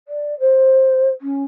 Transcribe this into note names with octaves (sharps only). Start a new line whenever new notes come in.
D5
C5
C#4